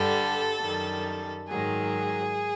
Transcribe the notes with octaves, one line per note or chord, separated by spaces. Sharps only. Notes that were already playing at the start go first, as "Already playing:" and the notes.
Already playing: G2 D3 G3 A4
F#2 D#3 G3
G#2 D#3 F#3 G#4